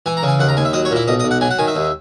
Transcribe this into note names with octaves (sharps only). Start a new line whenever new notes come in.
E3 G#5
A#5
C#3
G#5
D#2 F#5
A#5
D#2 G#5
E5
F#3 D#5
C#5
A#2 E4
B1 D#5
D#5
B1
F#5
F#3 G#5
F#5
D#3 G#5
E5
D#2